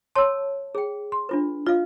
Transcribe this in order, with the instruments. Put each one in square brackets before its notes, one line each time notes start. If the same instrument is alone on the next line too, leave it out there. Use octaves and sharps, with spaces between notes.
[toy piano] C#5 A5 [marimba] C6 E6
[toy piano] G#4 G5
[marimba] C6
[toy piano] D4 F4 B4
[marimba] F4 [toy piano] D#5 F5